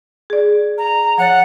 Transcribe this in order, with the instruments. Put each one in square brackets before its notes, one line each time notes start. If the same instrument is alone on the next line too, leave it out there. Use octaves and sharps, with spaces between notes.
[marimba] G#4 D5
[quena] A#5
[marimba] F3 C#5 A6 [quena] F#5